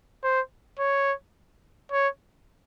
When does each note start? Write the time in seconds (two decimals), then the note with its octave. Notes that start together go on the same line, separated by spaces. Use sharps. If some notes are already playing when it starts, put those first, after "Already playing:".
0.24 C5
0.79 C#5
1.92 C#5